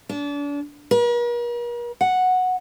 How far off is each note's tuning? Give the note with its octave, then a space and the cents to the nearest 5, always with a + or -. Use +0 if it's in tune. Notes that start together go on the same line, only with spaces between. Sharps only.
D4 -35
A#4 +45
F#5 -5